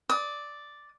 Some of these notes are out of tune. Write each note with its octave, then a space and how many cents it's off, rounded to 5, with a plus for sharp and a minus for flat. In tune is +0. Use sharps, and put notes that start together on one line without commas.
D5 +0 D#6 +40